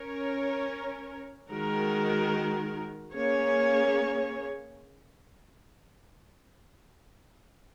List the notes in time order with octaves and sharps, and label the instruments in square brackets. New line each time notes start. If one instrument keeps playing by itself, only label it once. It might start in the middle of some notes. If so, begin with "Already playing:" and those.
Already playing: [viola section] C#4 A#4 C#5
D#3 G#3 F#4 A#4
A#3 C#4 G#4 C#5